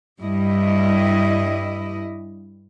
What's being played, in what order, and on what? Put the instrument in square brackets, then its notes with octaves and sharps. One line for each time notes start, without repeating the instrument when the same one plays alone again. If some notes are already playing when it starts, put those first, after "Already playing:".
[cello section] G2 G3 E4 D#5